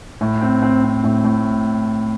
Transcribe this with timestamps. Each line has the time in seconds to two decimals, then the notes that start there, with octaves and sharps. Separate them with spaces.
0.21 A2
0.41 C4
0.62 C4
0.83 C4
1.04 A2
1.24 A2